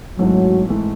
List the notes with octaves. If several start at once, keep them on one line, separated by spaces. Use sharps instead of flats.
G#1 G#2 E3 F#3 A3
G#1 G#2 E3 A3